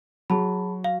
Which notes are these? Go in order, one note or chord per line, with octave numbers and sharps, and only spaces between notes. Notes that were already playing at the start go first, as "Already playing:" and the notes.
F#3 G#4 A5 B5
F5